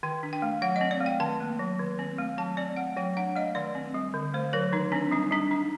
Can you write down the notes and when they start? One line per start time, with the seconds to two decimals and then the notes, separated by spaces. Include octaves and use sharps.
0.03 D#3 G5
0.23 D4
0.33 G5
0.42 A3
0.62 F#3 F#5
0.76 D#5
0.81 C4
0.91 D5
1.01 A3
1.06 G5
1.20 D#3 A5
1.40 A#3
1.60 F#3
1.79 D#3
1.99 C4
2.18 A3
2.38 F#3 A5
2.57 C4 D5
2.76 A3 F#5
2.96 F#3 G5
3.17 D4 F#5
3.36 A3 D#5
3.55 D#3 D5
3.75 C4
3.94 G3
4.14 D3
4.34 A3 C5
4.53 F#3 A#4
4.73 D#3 D#4
4.92 C4 D4
5.11 G3 D#4
5.31 G3 D4
5.51 D4 D#4